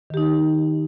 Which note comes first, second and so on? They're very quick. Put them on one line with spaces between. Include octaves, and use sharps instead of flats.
D#3 G4 D#4